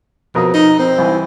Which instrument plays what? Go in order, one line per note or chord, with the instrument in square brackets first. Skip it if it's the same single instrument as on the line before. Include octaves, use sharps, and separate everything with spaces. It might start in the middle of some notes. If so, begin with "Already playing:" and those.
[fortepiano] F2 A#4 D#6 [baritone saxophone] B2
[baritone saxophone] D#4
C4
[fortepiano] C2 E3